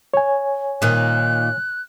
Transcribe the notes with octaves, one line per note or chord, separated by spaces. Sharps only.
C#5 G#5
A#2 D#3 F#6